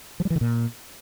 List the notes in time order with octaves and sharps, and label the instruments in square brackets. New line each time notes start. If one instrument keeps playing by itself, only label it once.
[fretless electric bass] F3
G3
E3
D3
A#2